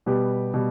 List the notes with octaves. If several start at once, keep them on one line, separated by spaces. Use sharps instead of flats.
B2 G3 B3 G4
B2 G3